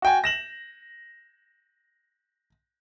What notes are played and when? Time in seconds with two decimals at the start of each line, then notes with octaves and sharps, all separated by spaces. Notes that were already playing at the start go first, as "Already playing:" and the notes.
0.02 F#4 G5 G#5
0.24 A#6 E7 F#7